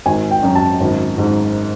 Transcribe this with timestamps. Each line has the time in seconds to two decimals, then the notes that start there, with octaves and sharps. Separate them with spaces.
0.06 G#1 G#5
0.31 G5
0.43 F#2
0.55 A5
0.80 G#1
1.18 G#2